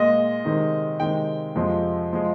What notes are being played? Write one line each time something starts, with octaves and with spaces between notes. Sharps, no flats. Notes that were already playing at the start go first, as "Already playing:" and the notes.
Already playing: A#2 G#3 D#5
C3 D#3 G#3
C3 D#3 G#3 G5
F2 C3 F3 G#3
F3 G#3